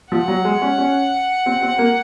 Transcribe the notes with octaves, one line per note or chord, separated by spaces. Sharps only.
F3 F#5
F#3
G#3
C#4
C#4
C4
C4
A#3